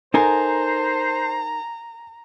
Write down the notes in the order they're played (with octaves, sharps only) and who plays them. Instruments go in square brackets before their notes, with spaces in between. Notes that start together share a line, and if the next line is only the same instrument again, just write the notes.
[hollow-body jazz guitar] D#4 A4 A#4 [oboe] C5 [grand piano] G#5 [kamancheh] A#5